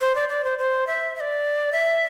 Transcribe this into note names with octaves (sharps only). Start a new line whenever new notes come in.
C5
D5
D5
C5
C5
E5
E5
D5
E5